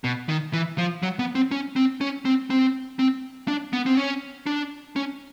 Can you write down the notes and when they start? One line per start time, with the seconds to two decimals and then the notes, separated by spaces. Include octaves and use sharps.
0.04 B2
0.29 D#3
0.53 E3
0.78 F3
1.03 F#3
1.19 B3
1.35 C4
1.51 C#4
1.76 C4
2.01 C#4
2.25 C4
2.50 C4
2.99 C4
3.48 D4
3.73 B3
3.86 C4
3.97 C#4
4.46 D4
4.96 C#4